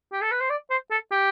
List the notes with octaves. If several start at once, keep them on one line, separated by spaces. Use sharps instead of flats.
G4
A4
B4
C5
D5
C5
A4
G4